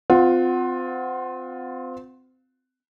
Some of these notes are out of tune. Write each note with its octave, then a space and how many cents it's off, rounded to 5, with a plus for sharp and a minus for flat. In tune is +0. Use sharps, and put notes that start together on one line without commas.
C4 -25 F4 +15 F#5 +10